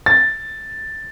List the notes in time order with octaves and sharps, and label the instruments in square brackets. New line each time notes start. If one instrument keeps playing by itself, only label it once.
[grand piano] A6